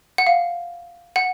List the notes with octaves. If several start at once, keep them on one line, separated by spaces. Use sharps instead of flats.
F#5
F5
F#5